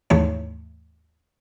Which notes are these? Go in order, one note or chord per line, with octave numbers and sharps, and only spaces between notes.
D#2 G#2 E3 A3 C#5